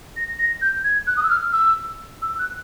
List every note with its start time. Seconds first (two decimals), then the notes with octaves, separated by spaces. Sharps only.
0.17 A#6
0.39 A#6
0.62 G6
0.84 G#6
1.07 F#6
1.17 D#6
1.23 E6
1.30 F6
1.53 E6
2.22 E6
2.39 F#6